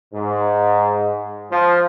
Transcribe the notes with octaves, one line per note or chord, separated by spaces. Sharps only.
G#2
F3